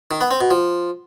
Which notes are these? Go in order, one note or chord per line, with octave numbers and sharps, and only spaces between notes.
D#3
B3
C4
B2
F3